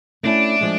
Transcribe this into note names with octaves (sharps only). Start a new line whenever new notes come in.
A3 C#4 D4 E4
F3 G#3